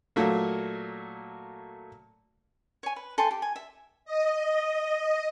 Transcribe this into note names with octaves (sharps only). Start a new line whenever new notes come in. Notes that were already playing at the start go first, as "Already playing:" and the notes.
A#2 F#3 A3 A#3
C#5 G#5
B4
A4 G5 G#5 C6
G4
G#5
E5
D#5